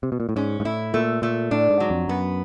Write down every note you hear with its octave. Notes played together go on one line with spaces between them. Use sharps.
C3
B2
A#2
A2
G#2 C#4
G#2
A2 E4
A#2 A3
A#2 A3
A2 D4
G#2
F#3
F2
F#2 B3